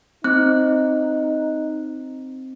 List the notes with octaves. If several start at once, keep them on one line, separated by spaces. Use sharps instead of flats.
C4 D#4 F#6